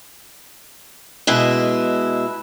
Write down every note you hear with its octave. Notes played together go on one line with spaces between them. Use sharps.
B2 G#3 E4